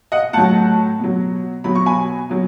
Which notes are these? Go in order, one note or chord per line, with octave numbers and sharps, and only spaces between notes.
D#5 F#5
A2 F#3 F#5 A5
B2 F#3
B2 F#3 B5
C#6
G#5 B5
B2 F#3